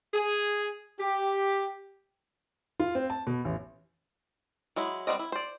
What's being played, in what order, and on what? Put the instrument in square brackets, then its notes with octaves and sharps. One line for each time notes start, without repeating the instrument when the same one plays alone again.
[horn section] G#4
G4
[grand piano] F4
C4
A5
B2
A1
[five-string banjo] F#3 G#3 E4
G3 B3 C4 D5 D#5
E4
C5 D5